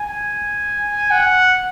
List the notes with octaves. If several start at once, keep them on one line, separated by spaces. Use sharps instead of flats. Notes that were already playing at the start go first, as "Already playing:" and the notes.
Already playing: G#5
F#5